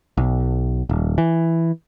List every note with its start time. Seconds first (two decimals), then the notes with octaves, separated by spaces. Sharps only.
0.17 B1
0.89 D#1
1.18 E3